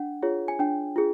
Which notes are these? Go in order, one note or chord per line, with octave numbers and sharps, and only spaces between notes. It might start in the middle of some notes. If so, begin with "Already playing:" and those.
Already playing: D4 F#5
F4 G#4 C#5
G#5
D4 G5
F4 G#4